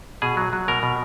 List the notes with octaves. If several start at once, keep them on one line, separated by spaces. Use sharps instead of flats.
B2 G#4
F#3
F#3
B2 A#4
B2